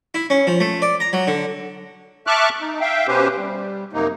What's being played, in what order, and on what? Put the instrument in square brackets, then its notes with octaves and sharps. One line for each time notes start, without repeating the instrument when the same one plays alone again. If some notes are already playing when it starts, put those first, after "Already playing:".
[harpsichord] E4
C#4
F3
A3
D5
A#5
F#3
D3
[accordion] E5 A5 C#6 D6 F6 F#6
D#4
E5 F5 G5
B2 C#4 G4 B4 C5
G3
F#2 C3 A#3 D#4